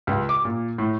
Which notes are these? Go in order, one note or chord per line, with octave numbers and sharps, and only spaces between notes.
C#2
D6
A#2
A2